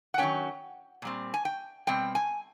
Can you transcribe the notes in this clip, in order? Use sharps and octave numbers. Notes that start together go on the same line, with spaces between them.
F#5
D#3 F#3 A#3 C#4 G5
A#2 G3 C4
G#5
G5
B2 G3 C4 G5
G#5